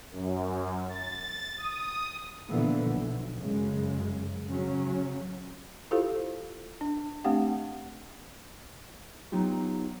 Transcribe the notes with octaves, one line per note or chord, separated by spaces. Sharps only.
F#2
A6
D#6
A#2 D3 E3 F3 B3
B1
F#2 C#3 G#3
C#3 F#3 C#4
E4 F4 G4 A4 C5 F5
D4
A3 C4 D4 G4 F5 F#5
F#3 B3 D#4 F4 G4